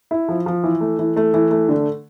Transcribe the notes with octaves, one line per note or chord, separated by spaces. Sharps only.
E4
F3
F3
E3
A3
E3
A3
E3
A3
D3